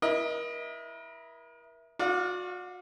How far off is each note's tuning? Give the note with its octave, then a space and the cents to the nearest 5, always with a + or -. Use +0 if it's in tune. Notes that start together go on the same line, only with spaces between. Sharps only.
E4 +0 A#4 +40 D#5 +0
F#4 -35 D5 +0 F5 +0